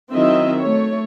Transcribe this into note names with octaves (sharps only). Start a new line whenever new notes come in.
D#3 F#3 C4 E4 D#5 E5
A3 C#5